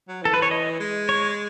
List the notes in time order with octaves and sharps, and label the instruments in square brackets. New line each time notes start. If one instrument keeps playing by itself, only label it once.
[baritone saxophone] F#3
[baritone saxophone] E3 [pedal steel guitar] A4
[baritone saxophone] E3 [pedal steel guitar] B4
[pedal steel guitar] C#5
D#5
[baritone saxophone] G#3
[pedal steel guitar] C#5